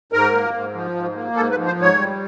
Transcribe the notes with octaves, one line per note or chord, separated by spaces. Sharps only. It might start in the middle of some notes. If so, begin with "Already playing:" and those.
G#2 A#4
A#3
G#2
F3
G#2
A#3
G#2 A4
B4
F3
C5
G#2 C#5
G3